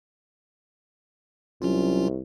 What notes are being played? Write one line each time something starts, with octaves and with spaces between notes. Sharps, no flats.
C2 F#3 C#4 F4